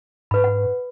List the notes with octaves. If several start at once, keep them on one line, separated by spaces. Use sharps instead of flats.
G#2 B4 B5
F#5